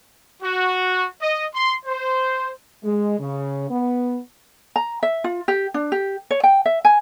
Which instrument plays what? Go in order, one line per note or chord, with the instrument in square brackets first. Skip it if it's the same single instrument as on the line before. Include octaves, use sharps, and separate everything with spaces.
[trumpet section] F#4
D#5
C6
C5
[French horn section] G#3
C#3
B3
[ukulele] A#5
E5
F4
G4
D4
G4
C#5
G5
E5
G#5